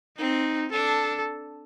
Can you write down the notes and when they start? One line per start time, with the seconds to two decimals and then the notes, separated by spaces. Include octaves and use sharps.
0.18 C4 D#4
0.72 D4 A4